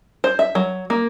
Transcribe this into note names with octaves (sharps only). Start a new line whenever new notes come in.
C5
E5
F#3
A#3